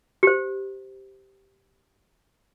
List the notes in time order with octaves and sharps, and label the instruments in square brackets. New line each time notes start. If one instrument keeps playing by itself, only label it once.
[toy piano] G4 C5